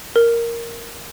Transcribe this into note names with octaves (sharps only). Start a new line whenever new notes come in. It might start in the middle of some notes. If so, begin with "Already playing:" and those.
A#4